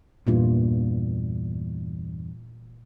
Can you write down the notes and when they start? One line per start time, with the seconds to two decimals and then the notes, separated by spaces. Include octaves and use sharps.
0.27 E2 G2 A#2 E3 A#3 F4